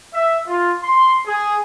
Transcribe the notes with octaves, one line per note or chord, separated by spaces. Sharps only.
E5
F4
C6
G#4